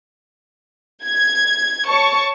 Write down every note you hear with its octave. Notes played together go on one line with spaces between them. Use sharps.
G#6
C#5 A5 C#6